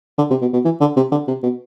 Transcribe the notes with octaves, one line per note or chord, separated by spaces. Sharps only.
D3
C3
B2
B2
E3
D3
C3
D3
C3
B2